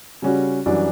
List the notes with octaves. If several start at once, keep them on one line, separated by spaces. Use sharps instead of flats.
C#3 G3 C#4 F#4
F#2 E3 G3 D4 F#4